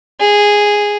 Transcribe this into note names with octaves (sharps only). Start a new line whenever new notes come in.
G#4